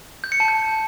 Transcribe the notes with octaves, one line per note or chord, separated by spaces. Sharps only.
G6
C#7
A5
G6